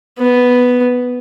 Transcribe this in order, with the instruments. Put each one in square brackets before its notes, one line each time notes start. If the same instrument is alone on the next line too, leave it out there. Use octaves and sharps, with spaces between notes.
[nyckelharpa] B3